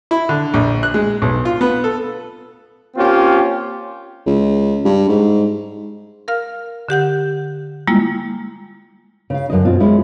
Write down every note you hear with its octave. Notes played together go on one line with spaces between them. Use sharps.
E4
D3
A#1
F#6
G#3
B1
F4
B3
A4
A#3 C4 C#4 F4 G4
C#2
G2
G#2
A#4 F5 F6
D3 G4 F#5 G6
G3 G#3 A#3 E4 F4
C#3 F5
F#2 D3 D#5
B2 C4 F4
G#3 C#4 E4 F4